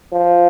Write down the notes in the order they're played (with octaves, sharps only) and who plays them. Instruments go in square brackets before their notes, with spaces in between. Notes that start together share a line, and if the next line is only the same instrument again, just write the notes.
[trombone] F3